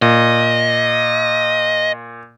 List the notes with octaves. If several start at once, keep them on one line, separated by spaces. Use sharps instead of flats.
A#2 D#5